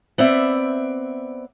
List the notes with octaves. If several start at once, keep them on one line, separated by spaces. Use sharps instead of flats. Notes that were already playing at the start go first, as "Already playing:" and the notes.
B3 C4 D5 E5